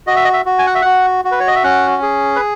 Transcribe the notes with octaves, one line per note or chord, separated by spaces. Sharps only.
F#4 D#5
E5
D#5
E5
F#4
G#5
F#5
E5
F#4 F#5
F#4
B4
C#5
D#5
E5
C#4 F#5
G#4
B4